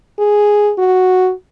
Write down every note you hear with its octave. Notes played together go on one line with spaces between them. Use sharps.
G#4
F#4